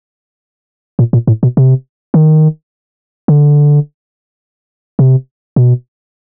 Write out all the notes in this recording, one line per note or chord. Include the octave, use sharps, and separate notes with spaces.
A#2
A#2
A2
B2
C3
D#3
D3
C3
B2